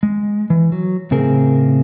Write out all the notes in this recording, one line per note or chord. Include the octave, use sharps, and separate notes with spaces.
G#3
E3
F#3
A2 C#3 C4 G#4 A#4